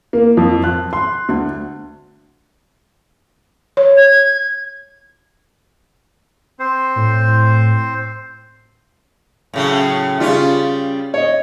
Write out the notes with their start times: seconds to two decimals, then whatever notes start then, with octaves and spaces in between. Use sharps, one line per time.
0.13 A#3
0.37 F2
0.64 F#6
0.93 C6
1.29 D2
3.77 C#5
3.97 G#6
6.59 C4 C5
6.96 A2
9.53 A2 C#3 F#3
10.20 C#3 G3 C#4 F4
11.14 C#5 D#5